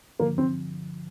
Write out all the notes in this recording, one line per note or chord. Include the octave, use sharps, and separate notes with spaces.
G2 D3 F3 A#3
C4